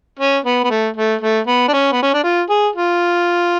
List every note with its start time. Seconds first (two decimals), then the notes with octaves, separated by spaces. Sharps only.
0.19 C#4
0.45 B3
0.64 B3
0.70 A3
0.96 A3
1.21 A3
1.47 B3
1.68 D4
1.73 C#4
1.92 B3
2.03 C#4
2.14 D4
2.24 F4
2.50 G#4
2.75 F4